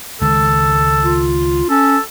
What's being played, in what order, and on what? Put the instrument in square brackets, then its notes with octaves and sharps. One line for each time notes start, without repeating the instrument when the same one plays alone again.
[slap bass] C#2 D#3 G#3 [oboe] A4
[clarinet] F4
[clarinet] C#4 [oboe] A4